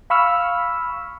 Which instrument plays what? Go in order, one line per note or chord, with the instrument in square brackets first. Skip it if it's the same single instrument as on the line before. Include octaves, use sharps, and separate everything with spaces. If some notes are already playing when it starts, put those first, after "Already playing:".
[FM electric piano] F5 B5 C#6 E6 F6